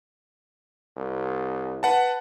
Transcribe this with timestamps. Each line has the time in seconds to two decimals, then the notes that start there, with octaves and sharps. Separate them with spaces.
0.97 C2
1.83 B4 F#5 A5